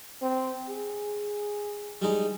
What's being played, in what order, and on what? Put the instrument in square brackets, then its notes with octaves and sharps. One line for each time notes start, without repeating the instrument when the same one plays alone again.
[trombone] C4
G#4
[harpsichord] G3 G#3 D#4